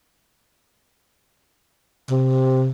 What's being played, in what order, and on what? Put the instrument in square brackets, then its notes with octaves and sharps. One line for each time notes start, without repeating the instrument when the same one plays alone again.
[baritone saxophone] C3